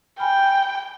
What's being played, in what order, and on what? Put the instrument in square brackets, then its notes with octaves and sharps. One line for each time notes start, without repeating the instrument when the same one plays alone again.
[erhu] G5 [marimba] G#5 B5 F6